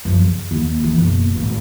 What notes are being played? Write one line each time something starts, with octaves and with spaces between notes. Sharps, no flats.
F#2 F3
C#3
D#2
C#3 E3
F#1 B2
G#1 A2